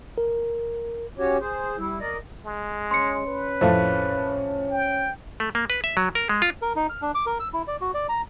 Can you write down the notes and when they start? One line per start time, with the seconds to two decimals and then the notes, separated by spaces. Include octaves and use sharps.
0.18 A#4
1.17 C#4 F#4 G4 C#5
1.40 G#4 C5
1.77 G3 E4
2.00 A#4 D5 D#5
2.45 G#3
2.91 C#4 C6 C#7
3.27 B4
3.61 F2 A2 A3 C5 F5
4.71 G5
5.40 A3
5.55 A#3
5.70 B4
5.84 E5
5.97 F#3
6.15 A#4
6.29 G#3
6.42 F4
6.61 A#4
6.76 D#4
6.90 F6
7.02 D4
7.15 D6
7.26 A#4
7.40 E6
7.53 E4
7.68 D5
7.81 F#4
7.94 D5
8.09 A#5